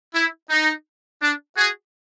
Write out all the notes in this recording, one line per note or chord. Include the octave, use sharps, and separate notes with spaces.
E4
D#4
D4
F#4 G#4